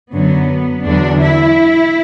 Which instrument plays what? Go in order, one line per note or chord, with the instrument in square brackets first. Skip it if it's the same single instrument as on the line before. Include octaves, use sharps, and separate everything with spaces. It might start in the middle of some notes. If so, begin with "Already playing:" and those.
[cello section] F#2 D3 F#3 B3
E2 D3 F#3 D4
E4